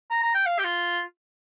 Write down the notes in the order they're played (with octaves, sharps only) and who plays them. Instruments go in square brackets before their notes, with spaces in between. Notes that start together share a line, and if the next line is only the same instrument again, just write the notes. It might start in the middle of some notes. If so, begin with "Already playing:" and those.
[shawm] A#5
A#5
G5
F5
G4
F4